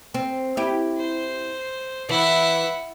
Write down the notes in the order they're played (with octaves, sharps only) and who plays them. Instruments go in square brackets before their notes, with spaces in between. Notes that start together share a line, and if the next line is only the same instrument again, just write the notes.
[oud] C4
E4 G4
[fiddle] C5
[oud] E3 [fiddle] E4 F#5